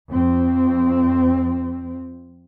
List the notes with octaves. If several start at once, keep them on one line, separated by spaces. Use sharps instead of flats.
F2 C4